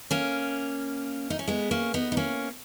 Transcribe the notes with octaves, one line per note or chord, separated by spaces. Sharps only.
A#3 C#4
D#4
C#4
G#3 B3
A#3 C#4
B3 D#4
D#4
A#3 C#4